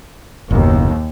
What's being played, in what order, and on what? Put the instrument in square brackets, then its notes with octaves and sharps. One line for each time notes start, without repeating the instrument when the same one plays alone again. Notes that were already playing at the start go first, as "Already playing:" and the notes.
[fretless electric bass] F#1 B2 [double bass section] D#2